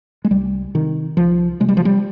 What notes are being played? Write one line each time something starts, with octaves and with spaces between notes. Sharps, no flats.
G#3
C2 G3
C3 D#3
C2 F3
C3 G#3
G3
F3
G3